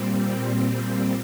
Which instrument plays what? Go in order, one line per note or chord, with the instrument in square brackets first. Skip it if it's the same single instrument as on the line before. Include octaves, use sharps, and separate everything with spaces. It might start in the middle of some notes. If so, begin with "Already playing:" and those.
Already playing: [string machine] A#2 G3 C4